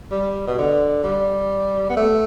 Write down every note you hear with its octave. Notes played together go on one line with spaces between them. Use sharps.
G3
B2
D3
G3
B3
A3